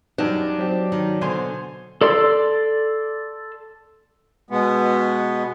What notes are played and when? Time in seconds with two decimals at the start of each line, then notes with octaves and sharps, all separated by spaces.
0.18 F#2 G3 D4 D#4
0.59 F#3 C4 G4
0.92 D#3
1.21 B2 D3 C5 G#5 C6
2.01 A4 D5 C6 E6
4.50 B2 G#3 B3